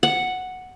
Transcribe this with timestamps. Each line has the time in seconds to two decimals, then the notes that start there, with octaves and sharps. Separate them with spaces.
0.03 F#5